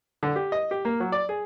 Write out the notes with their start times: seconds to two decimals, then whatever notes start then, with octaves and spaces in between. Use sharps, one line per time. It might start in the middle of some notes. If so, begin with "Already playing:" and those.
0.23 D3
0.36 G4
0.52 D#5
0.71 G4
0.85 A#3
1.00 F#3
1.12 D5
1.29 G#4